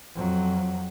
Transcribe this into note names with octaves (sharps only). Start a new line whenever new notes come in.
F2 F#3